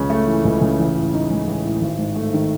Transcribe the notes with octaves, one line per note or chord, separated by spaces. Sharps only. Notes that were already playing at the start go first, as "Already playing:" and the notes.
Already playing: C#2 C#3
A3
E3
C#2
C#3
A1
A2
D#4
G#3
A1
A2
G#1
G#2
A3
D#3